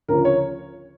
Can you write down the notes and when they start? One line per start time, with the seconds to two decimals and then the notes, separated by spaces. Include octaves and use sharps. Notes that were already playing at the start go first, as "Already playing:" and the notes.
0.09 D2 C#3 F3 C#4 A#4
0.25 C#5